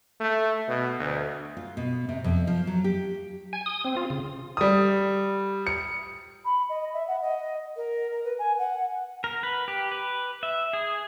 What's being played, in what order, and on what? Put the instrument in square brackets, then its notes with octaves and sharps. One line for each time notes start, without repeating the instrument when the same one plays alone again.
[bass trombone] A3
B2
D2
[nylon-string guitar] F4
B2
C3
F2
F3
F#3
G4
[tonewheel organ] G#5
D#6
C4
F4
C#3
[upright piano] G3 D#6
C#7
[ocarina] B5
D#5
E5
F#5
D#5
A#4
A#4
B4
G#5
F#5
[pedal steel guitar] A#4
B4
G4
B4
E5
G#4